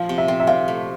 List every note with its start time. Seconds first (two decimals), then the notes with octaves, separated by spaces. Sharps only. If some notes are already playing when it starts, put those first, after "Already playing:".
Already playing: F3 F5
0.09 C3
0.18 E5
0.28 C4
0.40 E5
0.47 C4 F5
0.68 A3